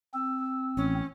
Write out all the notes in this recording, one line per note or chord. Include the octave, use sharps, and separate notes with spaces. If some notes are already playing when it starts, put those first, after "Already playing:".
C4 E6
A1 C#4